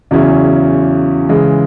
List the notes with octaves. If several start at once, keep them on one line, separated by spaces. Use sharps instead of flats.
E2 C#3 F#3 C#4 E4
C#3 E3 G#3